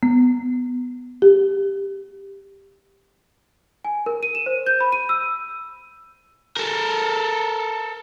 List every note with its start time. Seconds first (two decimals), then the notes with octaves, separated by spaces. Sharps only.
0.03 B3
1.22 G4
3.85 G#5
4.06 A#4
4.23 D#7
4.35 E7
4.46 C5
4.66 G6
4.81 B5
4.92 D#7
5.09 E6
6.57 A4 A#4